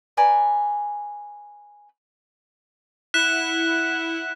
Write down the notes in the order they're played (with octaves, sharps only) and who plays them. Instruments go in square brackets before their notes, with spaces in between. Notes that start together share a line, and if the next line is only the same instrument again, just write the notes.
[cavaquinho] B4 D5 G#5 A#5
[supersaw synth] E4 F#5 [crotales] F#6 B6 E7